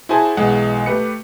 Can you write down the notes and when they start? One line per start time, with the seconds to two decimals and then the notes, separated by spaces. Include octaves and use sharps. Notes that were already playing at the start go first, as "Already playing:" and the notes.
0.09 E4 F#4 G#4 C5 G#5 A5
0.37 B1 E3 G#3 F#5
0.86 A3 G4 B4 C#7